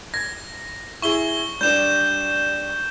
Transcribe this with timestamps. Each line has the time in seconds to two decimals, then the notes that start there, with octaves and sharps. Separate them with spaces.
0.14 G#6 A#6
1.02 E4 G#4 C#6 G7
1.61 G3 D4 G6 E7